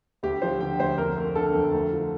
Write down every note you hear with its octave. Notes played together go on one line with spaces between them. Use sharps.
D2 G4
F3 C5
D3 G5
D2 C5
F2 A#4
A3
D3 A4
F2
D2
F3